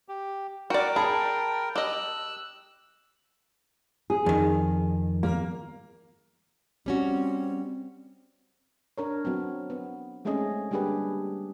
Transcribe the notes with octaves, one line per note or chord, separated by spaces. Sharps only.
G4
F#4 A#4 D5 G5
G#4 A5 B5
G4 D#5 E6 F#6
G#4
F2 D#3
A#3
G3 C4 C#4 F#4
D4 A#4 C#5
F#3 B3 C4
B3
G#3 A3 C4 C#4 G#4 D#5
G3 A#3 D4 G4 G#4 B4